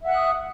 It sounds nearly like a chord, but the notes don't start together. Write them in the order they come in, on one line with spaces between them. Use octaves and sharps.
E5 F#5 F#6 D#6